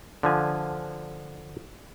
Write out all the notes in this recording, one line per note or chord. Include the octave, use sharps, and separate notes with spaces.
D3 F3 G#5